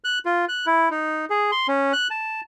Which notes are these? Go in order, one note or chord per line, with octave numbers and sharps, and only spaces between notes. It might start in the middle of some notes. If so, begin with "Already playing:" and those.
F#6
F4
F#6
E4
D#4
G#4
C6
C#4
F#6
A5